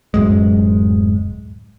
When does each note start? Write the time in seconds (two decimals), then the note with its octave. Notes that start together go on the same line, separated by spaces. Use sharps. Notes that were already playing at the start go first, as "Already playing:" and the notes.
0.14 D1 F#2 G#3